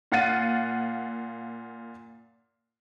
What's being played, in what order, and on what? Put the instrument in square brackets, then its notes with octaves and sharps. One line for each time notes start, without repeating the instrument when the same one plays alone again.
[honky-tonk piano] A#2 F5 F#5 A6 D#7